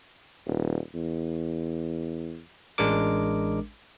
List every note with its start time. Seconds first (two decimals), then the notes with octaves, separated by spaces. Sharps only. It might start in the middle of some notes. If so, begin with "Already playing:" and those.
0.47 D#1
0.95 E2
2.78 A1 G#3 D4 A#4 D6